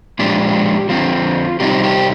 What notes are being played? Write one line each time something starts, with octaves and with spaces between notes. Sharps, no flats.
A#2 F3 G#3 D4 G4
D3 F3 C4 F4
C3 G3 C4 D#4 G4
G4